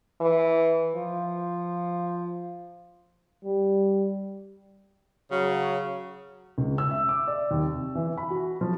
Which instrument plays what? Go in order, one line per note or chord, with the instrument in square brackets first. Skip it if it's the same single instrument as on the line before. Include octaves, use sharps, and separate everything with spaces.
[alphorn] E3
F3
[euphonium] G3
[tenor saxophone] C#3 [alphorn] F#3
[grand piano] C#2
E6
E5
D6
D5
D#2
C3
E3
B5
F#4
F3